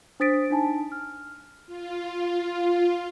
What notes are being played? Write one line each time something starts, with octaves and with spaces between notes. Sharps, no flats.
D4 C5 D#6 A6 B6 D7
D4 D#4 G#5 A5
F6
F4